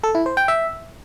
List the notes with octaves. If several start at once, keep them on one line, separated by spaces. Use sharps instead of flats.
A4
E4
C5
G5
E5